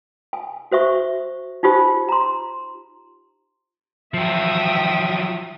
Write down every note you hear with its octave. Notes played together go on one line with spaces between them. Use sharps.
G#5
F#4 C5 E5 C#6
D#4 F4 G4 C5 G#5
A#5 C6
F3 F#3 E5 G5 D#6